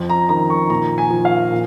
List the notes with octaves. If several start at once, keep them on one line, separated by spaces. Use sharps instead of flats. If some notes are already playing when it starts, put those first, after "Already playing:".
Already playing: F2
A#5
D#3 A#5
C#6
A#2 A#5
G#5
F3
F5
A#2